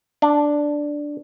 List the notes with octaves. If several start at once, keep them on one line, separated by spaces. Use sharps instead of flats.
D4